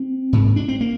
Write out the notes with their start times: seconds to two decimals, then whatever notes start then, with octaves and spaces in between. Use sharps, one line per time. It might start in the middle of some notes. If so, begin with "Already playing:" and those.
Already playing: C4
0.33 G#2
0.56 D4
0.68 C4
0.81 A#3